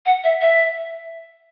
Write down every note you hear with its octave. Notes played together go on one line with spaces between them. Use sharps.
F#5
E5
E5